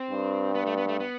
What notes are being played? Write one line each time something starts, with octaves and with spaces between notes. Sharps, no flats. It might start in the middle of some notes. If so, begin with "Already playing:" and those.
Already playing: C4
G2
B3
A3
B3
A3
B3